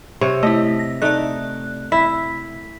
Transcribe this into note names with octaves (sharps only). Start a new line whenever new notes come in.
C3 C#5
A3 E4 D#5
A#6
A3 D#4 D5 F#6
E4 B6